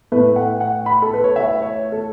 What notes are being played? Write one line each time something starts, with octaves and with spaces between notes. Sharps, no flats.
A2 A3 B4
F#5
F#5
B5
A4
B4
C#5
E5
C#5
A4